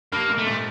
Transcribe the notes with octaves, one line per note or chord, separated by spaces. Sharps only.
G2 A#3
G#2
A3
A#2